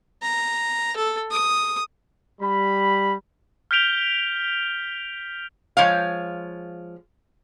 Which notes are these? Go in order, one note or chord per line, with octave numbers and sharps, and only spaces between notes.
A#5
A4
D#6
G3 B5
F6 G6 B6 D7 F7 G7
F3 G#3 C#5 F5